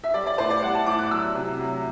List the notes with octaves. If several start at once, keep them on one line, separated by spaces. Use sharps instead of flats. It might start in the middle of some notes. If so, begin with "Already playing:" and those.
E5
G3 D5
D5
A2 C5
D5
G3 F#5
A5
A2 D6
F#6
F#3 E6
C3
F#3